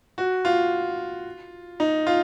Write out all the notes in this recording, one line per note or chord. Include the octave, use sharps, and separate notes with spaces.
F#4
F4
D#4
F4